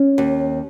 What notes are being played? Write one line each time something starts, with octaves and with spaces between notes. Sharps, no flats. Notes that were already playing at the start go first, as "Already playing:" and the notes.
Already playing: C#4
D#2